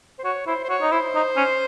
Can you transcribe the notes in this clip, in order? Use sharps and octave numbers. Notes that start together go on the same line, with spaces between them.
C5
F#4 C#5
E4 C5
C5
F#4 C#5
D#4
E4 C5
D#4
C#4